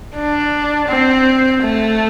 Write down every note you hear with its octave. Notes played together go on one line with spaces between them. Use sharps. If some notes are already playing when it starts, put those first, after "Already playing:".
D4
C4
A3